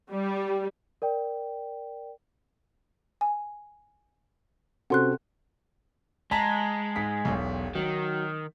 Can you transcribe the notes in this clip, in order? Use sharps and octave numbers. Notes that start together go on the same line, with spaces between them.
G3
A#4 D5 G5
G#5
C3 C#4 F#4 A4 C5 F#5 C6 F#6
G#3 A5 A#5 B6
G#2 B6
E1 B1
D#3 F#3